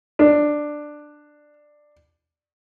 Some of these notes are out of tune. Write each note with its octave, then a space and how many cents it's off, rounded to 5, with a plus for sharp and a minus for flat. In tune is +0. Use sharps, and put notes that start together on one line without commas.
D4 +10